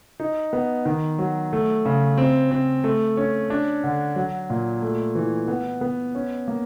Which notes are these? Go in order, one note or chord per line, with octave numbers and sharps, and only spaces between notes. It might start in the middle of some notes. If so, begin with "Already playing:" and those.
D#4
B3
D#3
F#3
A3
C#3
C4
C4
A3
C#4
D4
D3
F#3
A#2
A3
E3
B3
B3
C#4
A#3